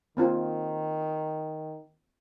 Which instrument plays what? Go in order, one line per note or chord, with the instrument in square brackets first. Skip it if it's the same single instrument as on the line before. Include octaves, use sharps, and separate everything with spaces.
[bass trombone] D#3 [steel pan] A#3 C4 F4